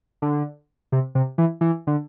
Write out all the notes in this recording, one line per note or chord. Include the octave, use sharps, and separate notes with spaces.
D3
C3
C3
E3
E3
D3